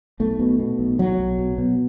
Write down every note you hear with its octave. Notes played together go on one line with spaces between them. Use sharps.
B1 A3
B2
B2
B1
B1 F#3
B1
B2
B2